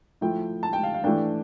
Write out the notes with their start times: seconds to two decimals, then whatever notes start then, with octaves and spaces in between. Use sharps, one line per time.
0.21 F3 A3 E4 G5
0.63 A5
0.73 G5
0.83 F5
0.94 F5
1.04 E3 A3 D4 G5